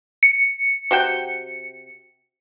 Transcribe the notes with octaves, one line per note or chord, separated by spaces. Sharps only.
C#7
C3 F#4 G5